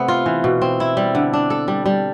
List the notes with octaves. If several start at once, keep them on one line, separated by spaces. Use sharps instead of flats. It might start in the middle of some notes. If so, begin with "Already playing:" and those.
Already playing: C3 A3 B3
F4
E3
B2
C4
E4
G3
D3
D4
A4
G3
G3